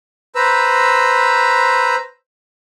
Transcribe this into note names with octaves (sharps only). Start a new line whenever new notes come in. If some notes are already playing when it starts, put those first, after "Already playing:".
B4 C5 A#5 E6